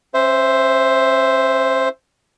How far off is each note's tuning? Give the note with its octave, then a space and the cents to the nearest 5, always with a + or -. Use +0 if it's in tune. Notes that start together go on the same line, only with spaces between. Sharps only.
C#4 -40 C5 +0 E5 +0